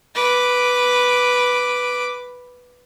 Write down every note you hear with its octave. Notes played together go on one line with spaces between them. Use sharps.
B4 D6